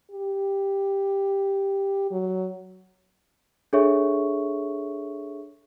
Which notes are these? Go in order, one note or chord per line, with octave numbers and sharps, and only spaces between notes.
G4
F#3
D4 G#4 A4 C#5 E5 C#6